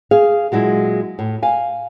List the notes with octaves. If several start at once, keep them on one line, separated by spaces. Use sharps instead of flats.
G#4 F5
A#2 F#3 G#3 E4
A2
F5 G#5